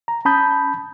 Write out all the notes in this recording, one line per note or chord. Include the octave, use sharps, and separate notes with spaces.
A#5
C#4 A5 B5 D#6 G6